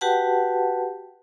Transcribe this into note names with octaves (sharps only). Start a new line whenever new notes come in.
F#4 G4 B4 F#5 G5 A5